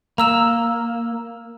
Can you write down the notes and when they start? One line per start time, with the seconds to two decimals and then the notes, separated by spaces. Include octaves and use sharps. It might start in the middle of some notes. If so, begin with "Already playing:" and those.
0.18 A#3 A#5 E6 E7